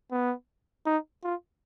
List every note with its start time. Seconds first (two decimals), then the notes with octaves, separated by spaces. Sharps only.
0.11 B3
0.86 D#4
1.24 F4